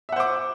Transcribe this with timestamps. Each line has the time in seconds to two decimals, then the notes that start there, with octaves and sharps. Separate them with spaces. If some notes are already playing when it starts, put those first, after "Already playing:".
0.09 E5
0.12 F#5
0.16 C5
0.20 D6